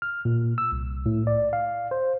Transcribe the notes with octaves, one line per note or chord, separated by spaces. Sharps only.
F6
A#2
E6
C2
A2
D5
F5
C5